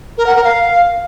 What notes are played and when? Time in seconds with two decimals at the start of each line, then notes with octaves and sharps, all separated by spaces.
0.17 A#4
0.26 F#5
0.35 A#4
0.44 F5